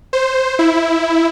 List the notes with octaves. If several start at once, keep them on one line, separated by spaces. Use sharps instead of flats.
C5
E4